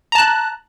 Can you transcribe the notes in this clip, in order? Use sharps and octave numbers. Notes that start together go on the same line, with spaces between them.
A5 A#5 F#6